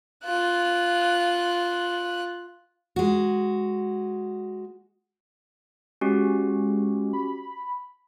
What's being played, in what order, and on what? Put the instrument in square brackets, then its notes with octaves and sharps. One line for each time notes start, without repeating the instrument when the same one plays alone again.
[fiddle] F4 F#6
[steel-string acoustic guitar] G#3 F#4
[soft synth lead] G#3 [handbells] C#4 F#4 G4
[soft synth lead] B5